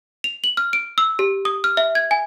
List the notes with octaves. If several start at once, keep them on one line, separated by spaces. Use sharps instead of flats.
F7
F#7
F6
D7
E6
G4
D#6
F6
E5
G#6
G#5